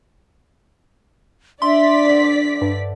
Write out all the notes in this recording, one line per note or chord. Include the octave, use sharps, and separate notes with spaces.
D4 D5 E5 C6 B6
D3 C5
G2